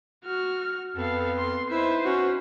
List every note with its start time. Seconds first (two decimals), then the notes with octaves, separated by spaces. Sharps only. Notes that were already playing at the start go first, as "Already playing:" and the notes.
0.25 F#4 F6
0.96 F2 B3 A4 F5
1.38 C6
1.70 D#4 E4 B4 C5 E5
2.05 C#4 F#4